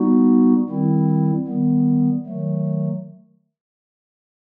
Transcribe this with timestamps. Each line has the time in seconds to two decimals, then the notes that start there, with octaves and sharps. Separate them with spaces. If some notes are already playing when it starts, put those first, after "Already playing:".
Already playing: G3 B3 D#4 F#4
0.69 D#3 G3 C4 E4
1.47 D#3 G3 B3
2.26 D#3 F#3 A3